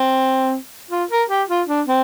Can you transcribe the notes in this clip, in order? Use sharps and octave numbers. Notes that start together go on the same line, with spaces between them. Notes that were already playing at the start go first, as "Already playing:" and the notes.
Already playing: C4
F4
A#4
G4
F4
D4
C4